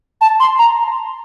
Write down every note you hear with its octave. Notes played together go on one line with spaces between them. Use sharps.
A5
C6
A#5